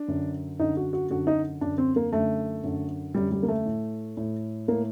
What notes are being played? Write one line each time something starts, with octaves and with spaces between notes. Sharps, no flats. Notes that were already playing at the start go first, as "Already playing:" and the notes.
Already playing: D4
F#2 D3
F#2 D3 D#4
F#4
F#4
F#2 D3 F#4
D#4
F#2 D3 D4
C4
A#3
F#2 D3 A3
F#2 D3
F#2 D3 G3
G3
A#3
A3
A2
A2
A2 A#3